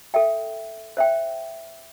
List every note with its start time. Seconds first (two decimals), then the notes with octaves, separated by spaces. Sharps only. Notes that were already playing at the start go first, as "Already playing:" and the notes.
0.14 A4 E5 G5
0.97 C5 E5 G5